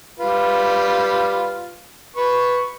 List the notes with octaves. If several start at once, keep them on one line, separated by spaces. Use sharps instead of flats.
G3 F4 B4
B4 C#6